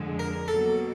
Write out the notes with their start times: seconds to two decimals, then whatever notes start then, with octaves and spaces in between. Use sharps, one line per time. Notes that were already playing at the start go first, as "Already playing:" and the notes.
Already playing: F2 D3 F3 G#3
0.19 A#4
0.48 B2 F#3 A#3 A4